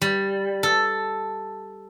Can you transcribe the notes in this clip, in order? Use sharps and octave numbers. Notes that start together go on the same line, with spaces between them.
G3
A4